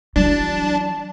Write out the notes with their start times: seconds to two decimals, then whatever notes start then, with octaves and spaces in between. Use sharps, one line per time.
0.16 E3 F#3 D4 A5